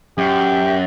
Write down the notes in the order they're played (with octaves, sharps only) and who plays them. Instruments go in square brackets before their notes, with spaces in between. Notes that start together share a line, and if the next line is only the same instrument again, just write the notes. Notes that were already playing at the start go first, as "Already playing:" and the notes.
[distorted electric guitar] F#2 [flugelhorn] G4